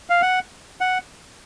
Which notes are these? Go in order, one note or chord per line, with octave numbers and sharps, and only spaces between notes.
F5
F#5
F#5